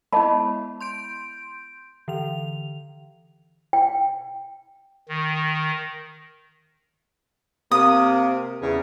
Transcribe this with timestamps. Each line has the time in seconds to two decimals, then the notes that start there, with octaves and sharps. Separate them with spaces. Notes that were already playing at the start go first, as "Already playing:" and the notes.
0.12 G#3 B3 E4 D#5 A5 B5
0.80 C6 G6 D7
2.08 D3 E3 F7
3.73 G5
5.09 D#3
7.71 C3 A#3 D#6
8.62 E2 C#3